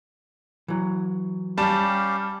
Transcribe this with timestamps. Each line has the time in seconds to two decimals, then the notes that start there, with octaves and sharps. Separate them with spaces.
0.68 E3 F#3
1.58 G3 C#4 G4 F5 A5